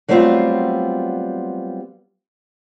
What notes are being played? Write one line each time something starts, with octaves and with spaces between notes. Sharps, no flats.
F#3 G3 A3 B3 C4 F4